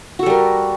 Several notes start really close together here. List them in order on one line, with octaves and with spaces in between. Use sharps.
F#4 A4 G3 A#4